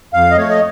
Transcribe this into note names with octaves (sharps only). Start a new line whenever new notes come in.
F2 F5
D#5
A3 C#5
D#5